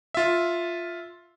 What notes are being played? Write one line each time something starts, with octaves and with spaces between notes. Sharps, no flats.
F4 E5